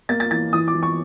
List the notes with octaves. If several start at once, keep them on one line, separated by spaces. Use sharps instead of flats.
A#3 A6
A6
E3 A6
E3 D#6
D6
E3
C#6